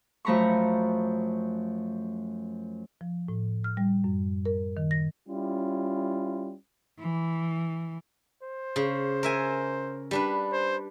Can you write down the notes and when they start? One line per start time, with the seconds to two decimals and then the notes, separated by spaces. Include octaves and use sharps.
0.25 F#2 F3 A3 A#5 B5 C#6
3.01 F3
3.29 A2
3.64 F6
3.77 G3
4.04 F#2
4.46 A#4
4.77 D#3
4.91 A#6
5.28 G3 C#4 E4 F4
7.00 E3
8.43 C5
8.76 C#3
9.23 A#4 E5 G#5
10.11 G3 D4 B4
10.53 C5